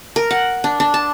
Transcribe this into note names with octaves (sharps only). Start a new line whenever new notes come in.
A#4
F#5
D4
D4
A5